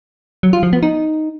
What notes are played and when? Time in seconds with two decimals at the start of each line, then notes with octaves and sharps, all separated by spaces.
0.43 F#3
0.53 F4
0.63 F3
0.73 B3
0.83 D#4